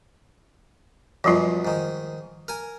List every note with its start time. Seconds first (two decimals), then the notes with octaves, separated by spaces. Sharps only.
1.24 F#2 B2 F3 G3 F4
1.65 G#2 D#3
2.48 A#4 G#5